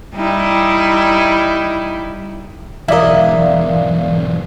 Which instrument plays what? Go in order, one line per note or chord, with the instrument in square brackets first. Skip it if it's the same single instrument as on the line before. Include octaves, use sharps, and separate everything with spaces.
[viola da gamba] G3 D#4 E4
[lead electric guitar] B1 E2 [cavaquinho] E4 D#5 [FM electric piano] A#4 D5 F5